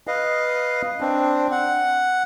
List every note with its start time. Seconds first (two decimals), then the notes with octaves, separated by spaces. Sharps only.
0.07 B4 D#5 F5
1.01 C4 D4
1.51 F#5